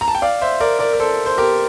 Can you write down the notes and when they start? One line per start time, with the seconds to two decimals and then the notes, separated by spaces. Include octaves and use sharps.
0.01 A#5
0.08 A5
0.15 G5
0.22 D5 F5
0.42 C5 E5
0.60 A#4 D5
0.79 A#4 D5
0.93 A#4
0.99 A4 C5
1.26 C5
1.38 G4 A#4